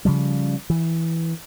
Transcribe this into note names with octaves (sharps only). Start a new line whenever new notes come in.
C#3 F3 G3
E3